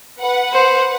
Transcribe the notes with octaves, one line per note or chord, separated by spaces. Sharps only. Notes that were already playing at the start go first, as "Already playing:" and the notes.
B4 F#5
C5